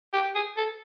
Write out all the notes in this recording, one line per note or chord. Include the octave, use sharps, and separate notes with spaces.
G4
G#4
A4